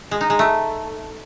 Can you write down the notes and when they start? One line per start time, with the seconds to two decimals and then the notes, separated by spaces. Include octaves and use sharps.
0.11 G#3
0.21 D#4
0.30 G#3
0.39 A3